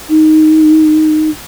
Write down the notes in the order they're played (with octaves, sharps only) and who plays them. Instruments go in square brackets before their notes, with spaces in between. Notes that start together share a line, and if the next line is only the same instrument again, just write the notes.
[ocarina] D#4